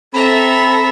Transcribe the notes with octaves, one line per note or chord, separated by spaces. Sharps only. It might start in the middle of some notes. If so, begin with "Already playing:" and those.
C4 A4 E5 A#5 B5